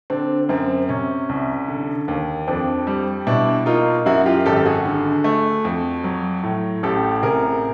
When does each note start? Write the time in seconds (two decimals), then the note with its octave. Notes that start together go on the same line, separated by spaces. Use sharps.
0.10 D3 C4 D4
0.49 F#2 C4
0.89 C3 C#4
1.29 C2
1.68 D3
2.08 D#2
2.47 F2 C4 D4
2.87 G3
3.27 B2 D4 E4
3.66 A#3 D#4 F4
4.06 F#2 E4 F#4
4.26 F4 G4
4.45 G#1 G4 A4
4.56 A4
4.66 F#4 G#4
4.85 D3
5.24 A3
5.65 F2
6.04 F#3
6.43 A2
6.83 A1 G4 A4
7.23 C3 G#4 A#4